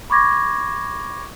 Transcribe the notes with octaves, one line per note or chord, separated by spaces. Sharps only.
B5 C#6 D6 G#6 A#6